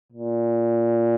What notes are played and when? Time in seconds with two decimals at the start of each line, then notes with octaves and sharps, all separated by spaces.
0.12 A#2